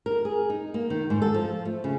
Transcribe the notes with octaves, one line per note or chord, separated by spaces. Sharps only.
A#4
G#4
D#4
A#3
D#3
G#2
A4
F3
A3
C#3